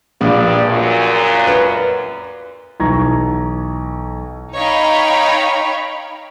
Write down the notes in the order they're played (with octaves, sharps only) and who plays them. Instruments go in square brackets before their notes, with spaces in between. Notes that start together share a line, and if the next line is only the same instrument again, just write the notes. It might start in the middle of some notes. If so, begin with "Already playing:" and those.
[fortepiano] A#1 [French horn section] G2 D5
[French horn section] F#2 A#2
[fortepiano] B4
[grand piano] B1 E3 A#5 C#6 G#6 A#6
[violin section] D#4 C#5 F5 G5 B5